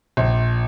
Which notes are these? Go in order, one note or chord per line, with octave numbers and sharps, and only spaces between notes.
A#1